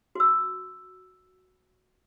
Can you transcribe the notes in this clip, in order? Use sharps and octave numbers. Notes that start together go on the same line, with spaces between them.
F#4 E6